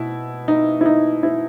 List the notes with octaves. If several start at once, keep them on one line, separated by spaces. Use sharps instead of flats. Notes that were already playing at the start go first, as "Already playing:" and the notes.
Already playing: B2 E4
D#4
E4
D#4
E4